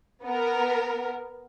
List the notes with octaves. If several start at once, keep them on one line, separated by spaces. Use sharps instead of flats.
B3 A#4